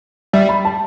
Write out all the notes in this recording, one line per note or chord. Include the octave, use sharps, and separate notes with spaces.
G3 E5
B5
A5